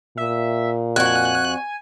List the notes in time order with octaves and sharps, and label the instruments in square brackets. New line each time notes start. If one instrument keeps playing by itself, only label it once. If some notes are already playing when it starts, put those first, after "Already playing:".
[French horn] A#2 [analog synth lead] E5
[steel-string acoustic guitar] F2 F#4 [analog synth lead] G#5 [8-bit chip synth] F#6